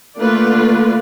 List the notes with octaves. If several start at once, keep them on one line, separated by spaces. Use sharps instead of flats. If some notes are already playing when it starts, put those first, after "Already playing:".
D3 A3 A#3 F4 B4 D5